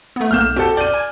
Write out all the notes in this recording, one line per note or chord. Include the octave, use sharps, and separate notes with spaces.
A3 B3
B1 A#3 F6 G6 E7
C4 F#4 G4 A4
D5 G6 D#7
G#5